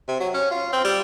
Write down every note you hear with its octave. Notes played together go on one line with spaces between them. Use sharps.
C3
F#3
C#4
F4
C4
G3